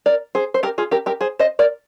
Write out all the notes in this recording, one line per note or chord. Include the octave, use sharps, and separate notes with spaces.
A#4 D5
G#4 C5
C5
G4 A#4
F4 G#4
G4 A#4
G4 A#4
G#4 C5
C5 D#5
A#4 D5